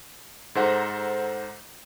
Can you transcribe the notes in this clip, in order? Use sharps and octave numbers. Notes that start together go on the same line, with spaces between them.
G#2 A4 C5 F#5 A#5